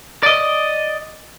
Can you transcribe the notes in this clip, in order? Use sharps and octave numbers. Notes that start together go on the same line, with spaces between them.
D5 D#5